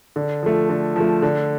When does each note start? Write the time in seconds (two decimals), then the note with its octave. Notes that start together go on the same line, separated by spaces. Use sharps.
0.16 D3
0.43 F3 A3
0.69 D3
0.96 F3 A3
1.22 D3